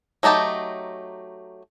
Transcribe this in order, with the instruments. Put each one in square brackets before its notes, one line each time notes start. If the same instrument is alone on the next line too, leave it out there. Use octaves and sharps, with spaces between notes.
[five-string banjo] F#3 A3 D#4 G4 A5